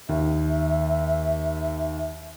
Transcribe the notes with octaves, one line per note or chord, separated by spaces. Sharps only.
D#2 E5